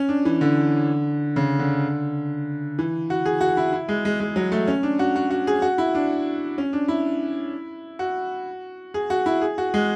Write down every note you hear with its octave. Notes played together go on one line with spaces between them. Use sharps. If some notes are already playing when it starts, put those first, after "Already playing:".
Already playing: C#4
D4
E3
D3
C#3
D3
E3
F#4
G#4
F#4
E4
E4
G#3
G#3
G#3
F#3
A3
C#4
D4
F#4
F#4
F#4
G#4
F#4
E4
D4
C#4
D4
E4
F#4
G#4
F#4
E4
G#4
F#4
G#3